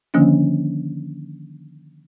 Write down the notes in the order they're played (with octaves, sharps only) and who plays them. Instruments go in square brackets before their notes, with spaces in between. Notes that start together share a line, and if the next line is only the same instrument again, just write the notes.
[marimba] D3 D#3 F3 A#3 C#4 D4